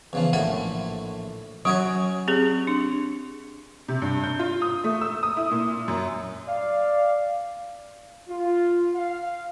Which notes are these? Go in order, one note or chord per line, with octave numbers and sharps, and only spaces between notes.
E2 C#3 F3
A#1 A2 E4 F#5
F#3 C#4 F#4 C#5 G#5
C4 G4 G#4
D4
C3
G2
G6
F4
D#6
A3
E6
D#6
E4
A#2
F#2
D5 F5
F4
F5